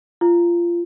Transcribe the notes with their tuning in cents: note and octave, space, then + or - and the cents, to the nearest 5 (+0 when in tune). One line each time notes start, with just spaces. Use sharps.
F4 -20